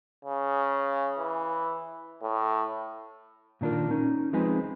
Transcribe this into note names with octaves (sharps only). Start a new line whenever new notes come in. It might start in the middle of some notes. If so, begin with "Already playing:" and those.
C#3
E3
A2
A#2 D#3 D4 F4 A#4
C#4 D#4
F3 G#3 C4 D#4 B4 G#5